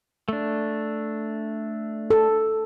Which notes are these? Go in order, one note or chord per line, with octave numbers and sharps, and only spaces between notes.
A3 D4
A4